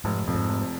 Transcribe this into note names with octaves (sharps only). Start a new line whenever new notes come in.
F1 G#2
F2 A#2
G#2
F1